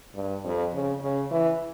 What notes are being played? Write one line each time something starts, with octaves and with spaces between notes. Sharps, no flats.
G2
F2
C#3
C#3
E3